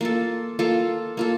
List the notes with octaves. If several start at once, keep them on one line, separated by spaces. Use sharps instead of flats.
A#3 F4 A4
A#3 F4 A4
A#3 F4 A4